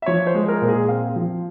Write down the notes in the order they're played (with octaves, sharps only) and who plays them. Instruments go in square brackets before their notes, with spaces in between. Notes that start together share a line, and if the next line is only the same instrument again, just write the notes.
[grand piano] E5
F3 C#5
C5
G#3
A#4
A#2
G#4
C4 F5
F3